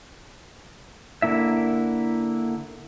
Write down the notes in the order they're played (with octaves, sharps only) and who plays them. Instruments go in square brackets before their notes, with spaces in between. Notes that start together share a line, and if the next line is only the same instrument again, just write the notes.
[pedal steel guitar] D3 A#3 E4 E5